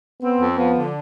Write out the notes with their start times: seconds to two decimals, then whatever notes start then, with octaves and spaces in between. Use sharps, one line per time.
0.22 B3 C4
0.41 F2
0.57 F3 B3
0.75 D3